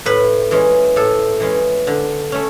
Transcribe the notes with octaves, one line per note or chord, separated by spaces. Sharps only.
A2 B4
E3 G#3 C#4
A2 A4
E3 G#3 C#4
D3
A3 C#4